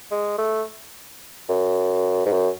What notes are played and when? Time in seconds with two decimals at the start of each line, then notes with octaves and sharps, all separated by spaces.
0.11 G#3
0.38 A3
1.49 F#2
2.26 G#2
2.33 F#2